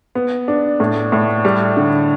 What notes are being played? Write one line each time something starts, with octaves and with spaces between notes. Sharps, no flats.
B3
D4
A2
A2
G3
D3